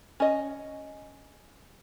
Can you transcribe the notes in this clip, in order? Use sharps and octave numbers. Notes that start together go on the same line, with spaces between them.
C#4 D#5